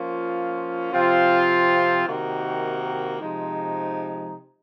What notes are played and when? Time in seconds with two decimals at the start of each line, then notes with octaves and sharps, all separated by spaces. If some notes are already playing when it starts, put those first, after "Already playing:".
Already playing: F3 A#3 C#4 F4
0.91 C3 F3 C4 F4
2.06 C3 D#3 A#3 D#4 F#4
3.20 C3 F3 G#3 D#4